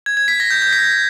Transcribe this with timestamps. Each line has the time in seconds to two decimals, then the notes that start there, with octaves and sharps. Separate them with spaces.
0.06 G#6
0.17 G#6
0.28 B6
0.40 A#6
0.51 G6
0.62 G6
0.73 B6